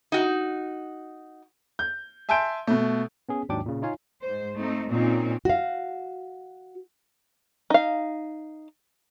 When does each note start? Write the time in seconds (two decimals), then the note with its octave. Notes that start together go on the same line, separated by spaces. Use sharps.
0.12 D#4 F#4
1.79 G6
2.29 E5 G#5 A5 C6 G6 D7
2.67 B2 A3
3.29 B3 C#4 G#4
3.49 D#2 G#2 F#3 D4 G5 D6
3.66 A#2 C#3
3.82 D#4 F4 C#5 F5 G#5
4.22 G#2 C5
4.56 A3 C4 D#4
4.89 A#2 C4 C#4 D#4
5.45 F#4 F5
7.70 D#4 F5